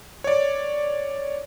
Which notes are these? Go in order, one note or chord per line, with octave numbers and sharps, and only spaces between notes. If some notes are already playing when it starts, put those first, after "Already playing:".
C#5 D5